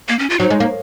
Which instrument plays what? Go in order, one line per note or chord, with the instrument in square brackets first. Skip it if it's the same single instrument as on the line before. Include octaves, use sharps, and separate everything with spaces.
[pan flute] A#3
C#4
F4
[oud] F#3 [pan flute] D#4
[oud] G#3
A#3